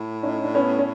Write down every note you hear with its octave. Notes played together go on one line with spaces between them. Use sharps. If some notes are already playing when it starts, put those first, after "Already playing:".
Already playing: A2
C#4 D#4
D4
B3 C#4
C#4